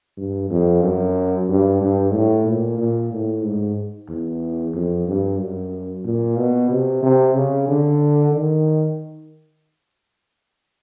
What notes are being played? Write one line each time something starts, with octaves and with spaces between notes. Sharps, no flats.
G2
F2
F#2
G2
G2
A2
A#2
A#2
A2
G#2
E2
F2
G2
F#2
A#2
B2
C3
C3
C#3
D3
D#3